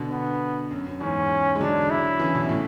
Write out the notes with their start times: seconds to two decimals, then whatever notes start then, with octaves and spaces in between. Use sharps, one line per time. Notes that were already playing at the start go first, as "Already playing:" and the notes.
Already playing: B2 D3
0.11 B3
0.71 F#2
0.86 F#2
1.01 E2 G#2 C#4
1.55 G#3
1.61 D3 F#3 D4
1.90 E4
2.19 C#3 E3
2.35 B2 D3
2.49 A2 C#3